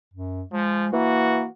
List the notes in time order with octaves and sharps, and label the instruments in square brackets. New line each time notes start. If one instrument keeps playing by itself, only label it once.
[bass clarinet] F#2
[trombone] F3 [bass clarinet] G#3
[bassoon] E3 [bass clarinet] A#3 [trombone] F#4